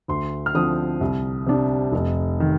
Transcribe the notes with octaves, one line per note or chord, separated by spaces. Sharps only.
D2 C6
F6
D3 F3 C4 D#6
C2
C3 G3 D4
F1
D#3